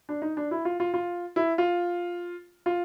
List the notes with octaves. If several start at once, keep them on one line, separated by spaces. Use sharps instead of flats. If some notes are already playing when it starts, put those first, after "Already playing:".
D4
D#4
D4
E4
F4
F4
F4
E4
F4
F4